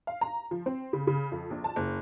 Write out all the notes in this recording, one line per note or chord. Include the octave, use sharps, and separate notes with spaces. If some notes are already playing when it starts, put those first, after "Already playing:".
F5
A#5
F3
C4
C#3
C#3
F2
A#1
A5
F#1